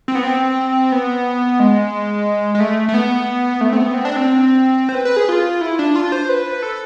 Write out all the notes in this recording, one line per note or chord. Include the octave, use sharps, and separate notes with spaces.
C4
B3
C4
B3
G#3
G#3
A3
A3
B3
A3
C4
B3
C4
D4
C4
C5
B4
B4
G#4
F4
E4
D4
F4
C5
B4
A4